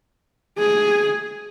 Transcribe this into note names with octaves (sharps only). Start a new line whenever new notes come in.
G#4